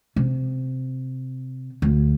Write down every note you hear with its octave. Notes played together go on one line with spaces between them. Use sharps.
C3
D2